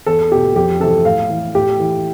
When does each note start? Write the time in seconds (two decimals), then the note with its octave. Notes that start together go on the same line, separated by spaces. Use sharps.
0.06 E2 A4
0.32 B2 G4
0.56 F2 G4
0.80 C3 E3 A4
1.05 A2 F5
1.30 E3
1.55 A2 G4
1.80 E3